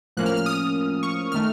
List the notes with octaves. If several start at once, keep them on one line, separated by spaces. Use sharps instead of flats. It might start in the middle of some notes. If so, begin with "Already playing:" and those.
A2 F3 A#3 C#4 F#6
F6
F6
D#6
C#6
D#3 A3 F6